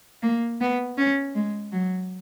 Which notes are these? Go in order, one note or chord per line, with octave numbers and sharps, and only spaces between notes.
A#3
B3
C#4
G#3
F#3